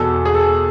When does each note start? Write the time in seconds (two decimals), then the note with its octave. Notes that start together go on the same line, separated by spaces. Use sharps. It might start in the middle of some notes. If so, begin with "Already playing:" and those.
Already playing: E2 B2 A4
0.25 G#4
0.34 A4